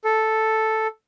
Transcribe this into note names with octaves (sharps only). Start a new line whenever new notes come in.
A4